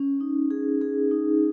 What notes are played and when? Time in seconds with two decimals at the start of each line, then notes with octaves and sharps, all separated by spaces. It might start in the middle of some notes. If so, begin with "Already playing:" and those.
Already playing: C#4
0.21 D#4
0.51 G#4
0.81 G#4
1.11 D#4